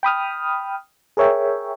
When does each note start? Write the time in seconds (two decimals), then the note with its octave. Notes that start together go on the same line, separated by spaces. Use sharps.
0.03 G5 B5 D#6 F6
1.17 G#4 A#4 C#5 E5 G5